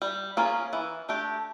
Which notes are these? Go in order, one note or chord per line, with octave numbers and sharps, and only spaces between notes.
G3
A#3 C#4 F4 G#4
E3
A3 D4 G4